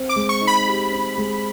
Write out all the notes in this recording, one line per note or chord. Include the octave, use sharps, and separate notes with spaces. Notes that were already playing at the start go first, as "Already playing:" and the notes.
Already playing: C4
D6
G#3
C#6
D#4
B5
G4
C4
G#3